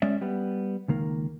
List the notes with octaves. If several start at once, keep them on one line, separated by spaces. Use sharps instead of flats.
G#3 C#4 D5 E5
G3 B3
C#2 D#3 A#3